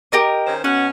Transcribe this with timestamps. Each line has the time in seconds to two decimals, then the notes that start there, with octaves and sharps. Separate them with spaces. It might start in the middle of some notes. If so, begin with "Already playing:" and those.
0.12 G4 A#4 D#5
0.47 D#3 C#4 C5
0.64 B2 C#4 F#5